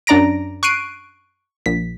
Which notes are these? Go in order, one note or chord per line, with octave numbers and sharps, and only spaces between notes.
F#2 D4 D5 A#5 A#6 D7
C#6 F#6 C7 D7 D#7
A#1 B6